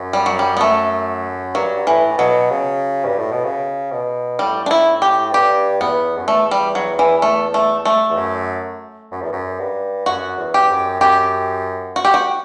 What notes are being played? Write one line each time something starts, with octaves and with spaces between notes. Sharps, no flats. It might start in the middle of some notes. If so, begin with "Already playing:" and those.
Already playing: F#2
G3
F#3
G3
B3
A3
G2 F#3
A2 E3
B2 F#3
C#3
G2
A2
B2
C#3
B2
A2 G3
D4
E4
G4
G2 G4
E2 B3
F#2
E2 A3
G3
F#3
E3
A3
A3
A3
E2
F#2
F#2
E2
F#2
G2
F#2 F#4
E2
G4
F#2
F#2 G4
F#4
G4
F#4